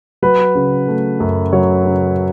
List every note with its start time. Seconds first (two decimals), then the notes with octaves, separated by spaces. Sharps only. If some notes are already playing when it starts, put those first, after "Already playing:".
0.22 F#3 B4
0.55 C#3
0.88 A3
1.20 F#2
1.53 F#3 C#5
1.85 C#3